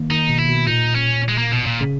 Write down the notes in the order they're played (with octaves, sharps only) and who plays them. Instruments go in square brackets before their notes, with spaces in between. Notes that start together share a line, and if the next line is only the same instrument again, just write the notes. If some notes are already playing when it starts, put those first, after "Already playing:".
Already playing: [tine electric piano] D#3 A#3
[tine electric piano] D#3 [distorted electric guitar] D#4
[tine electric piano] B2
[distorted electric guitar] E4
[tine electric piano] B2
[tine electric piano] A#2 [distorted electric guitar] D#4
[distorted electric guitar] C#4
G#3
A#3
B2
A#2
[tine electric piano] C#3